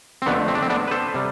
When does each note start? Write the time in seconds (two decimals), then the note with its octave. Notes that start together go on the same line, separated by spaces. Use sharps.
0.22 C4
0.26 F2 D3 A3 B3 D4
0.48 C4
0.55 D4
0.62 C4
0.70 B3 D4
0.87 B4
0.91 A4 C5
1.14 C3 G3